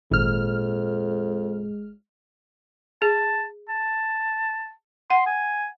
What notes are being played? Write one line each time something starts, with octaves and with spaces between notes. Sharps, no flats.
G#1 F2 A#2 G#3 F6
G#4 A5
A5
F#5 C6
G#5